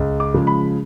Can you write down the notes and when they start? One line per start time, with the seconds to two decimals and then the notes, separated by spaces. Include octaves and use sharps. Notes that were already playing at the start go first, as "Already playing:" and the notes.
Already playing: C#2
0.20 D6
0.34 C#3 F3 G#3
0.47 B5